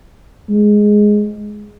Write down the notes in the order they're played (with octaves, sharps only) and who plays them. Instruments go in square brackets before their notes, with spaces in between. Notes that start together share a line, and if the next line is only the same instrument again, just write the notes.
[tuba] G#3